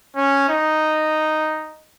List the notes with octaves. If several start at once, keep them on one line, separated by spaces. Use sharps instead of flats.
C#4
D#4